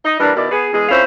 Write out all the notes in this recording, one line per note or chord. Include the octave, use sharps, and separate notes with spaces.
D#4 D#5
E3 G3 A#3 D4
B2 D#3 E4 D5
B3 G#4
E2 G#3 G#4
F2 C#4 E4 C5 F5